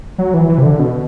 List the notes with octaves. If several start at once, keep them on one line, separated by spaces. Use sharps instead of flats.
F#3
E3
E3
C3
D3
B2